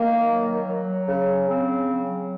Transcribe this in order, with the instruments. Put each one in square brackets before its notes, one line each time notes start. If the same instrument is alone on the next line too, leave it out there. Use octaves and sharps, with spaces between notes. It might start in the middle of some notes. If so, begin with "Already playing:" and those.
Already playing: [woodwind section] D#3 A#3
F#3
F#3
C#3
C#3 C4
F#3